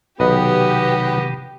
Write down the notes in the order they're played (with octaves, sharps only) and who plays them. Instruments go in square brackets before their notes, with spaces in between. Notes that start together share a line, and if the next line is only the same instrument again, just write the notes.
[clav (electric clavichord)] B1 B4 D#5 [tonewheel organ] C3 D#3 [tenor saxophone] B3 [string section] G4